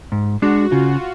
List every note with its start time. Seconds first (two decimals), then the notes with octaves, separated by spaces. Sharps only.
0.12 G#2
0.42 G#3 D4 F#4
0.71 C#3 F4